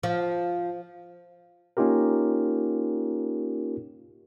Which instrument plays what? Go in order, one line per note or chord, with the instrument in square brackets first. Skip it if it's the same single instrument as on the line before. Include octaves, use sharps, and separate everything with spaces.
[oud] F3
[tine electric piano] A#3 C#4 D#4 F4 G4 A#4